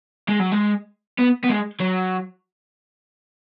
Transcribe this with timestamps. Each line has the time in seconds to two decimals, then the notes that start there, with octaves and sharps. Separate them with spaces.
0.28 G#3
0.40 F#3
0.52 G#3
1.18 B3
1.43 B3
1.49 G#3
1.80 F#3